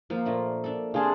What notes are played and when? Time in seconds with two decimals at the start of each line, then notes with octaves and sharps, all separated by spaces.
0.10 F3 A#3
0.25 A#2 A3 D4
0.64 D4 A4
0.94 C3 D4 F4 G#4 C6